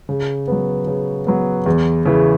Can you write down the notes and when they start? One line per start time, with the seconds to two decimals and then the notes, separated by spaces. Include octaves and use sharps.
0.09 C#3
0.48 F#3 B3
0.87 C#3
1.27 F#3 B3
1.66 E2
2.05 C#3 E3